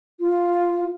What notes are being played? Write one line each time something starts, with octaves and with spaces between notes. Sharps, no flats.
F4